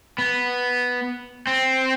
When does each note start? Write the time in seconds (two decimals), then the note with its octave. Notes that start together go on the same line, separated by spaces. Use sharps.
0.18 B3
1.47 C4